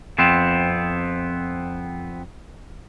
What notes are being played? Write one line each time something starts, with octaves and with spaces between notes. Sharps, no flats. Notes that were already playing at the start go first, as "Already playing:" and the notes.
F2 B3 C4